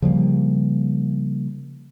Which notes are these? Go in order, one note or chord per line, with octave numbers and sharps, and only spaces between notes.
C#3 F3 G3 A#3